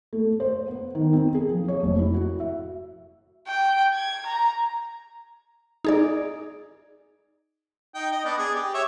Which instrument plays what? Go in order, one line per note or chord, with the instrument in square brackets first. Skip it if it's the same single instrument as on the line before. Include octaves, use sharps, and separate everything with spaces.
[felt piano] A3
C5
B3
D#3
C4
G#4
F3
C#5
F1
E4
F#4
E5
[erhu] G5
G#6
A#5
[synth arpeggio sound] D#4 G#4 D5
[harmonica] D#4 G5
D#5
B3 D4
G#4
G4
C#5 E5